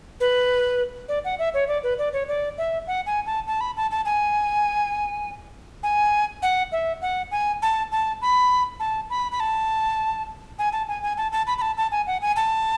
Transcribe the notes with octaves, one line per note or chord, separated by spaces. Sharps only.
B4
D5
F#5
E5
C#5
D5
B4
D5
C#5
D5
E5
F#5
G#5
A5
A5
B5
A5
A5
G#5
G#5
F#5
E5
F#5
G#5
A5
A5
B5
A5
B5
B5
A5
G#5
A5
G#5
G#5
A5
A5
B5
B5
A5
A5
G#5
F#5
G#5
A5